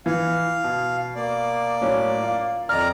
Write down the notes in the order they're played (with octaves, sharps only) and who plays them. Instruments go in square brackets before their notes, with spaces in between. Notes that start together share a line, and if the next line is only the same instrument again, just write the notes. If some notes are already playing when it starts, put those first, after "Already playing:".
[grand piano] E3 [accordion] F5
[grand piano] B2
[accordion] A#3 D5
[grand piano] A2 F#3 C#4
F4
[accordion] F2 D5 A#5 [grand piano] D#5 F6